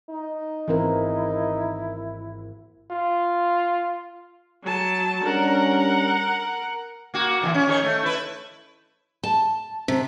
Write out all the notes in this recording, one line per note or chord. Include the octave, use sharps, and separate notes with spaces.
D#4
G#1 E3 A#3 C4 E4 G#4 A#4
F4
F#3 A5
G3 C#4 D4 A#4 F#5
A#3 F#4
A#2 D#3 E3
C#4
D#3 G#4 C#5
A3
E4 B4
A5
C3